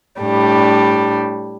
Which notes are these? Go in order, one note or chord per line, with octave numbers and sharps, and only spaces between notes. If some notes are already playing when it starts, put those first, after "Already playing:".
A2 G3 D4